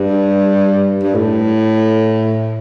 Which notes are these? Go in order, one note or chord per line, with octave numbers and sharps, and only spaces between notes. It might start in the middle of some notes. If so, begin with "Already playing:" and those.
Already playing: G2
G2
A2